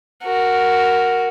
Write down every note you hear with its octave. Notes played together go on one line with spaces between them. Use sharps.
F#4 A#4